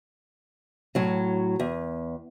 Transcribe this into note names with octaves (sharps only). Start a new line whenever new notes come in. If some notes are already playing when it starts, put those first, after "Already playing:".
A2 F#3
E2